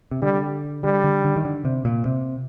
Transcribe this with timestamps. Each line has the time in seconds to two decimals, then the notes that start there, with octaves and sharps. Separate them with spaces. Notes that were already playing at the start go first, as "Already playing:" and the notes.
0.11 C3
0.22 D3 G3
0.84 D3 G3
1.04 D3
1.25 D3
1.36 D#3
1.45 D3
1.65 C3
1.85 A#2
2.06 C3